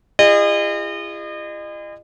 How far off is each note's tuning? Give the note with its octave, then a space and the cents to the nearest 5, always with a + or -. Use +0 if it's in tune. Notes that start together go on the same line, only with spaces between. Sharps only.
E4 +45 G#4 -40 D#5 -35